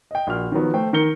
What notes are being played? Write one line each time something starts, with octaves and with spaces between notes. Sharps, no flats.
D#5 G5
A#1 F#4 F6
D#3 F3 F#3 B3
A3 C5 G5
D#3 A#4 G6 C#7 G7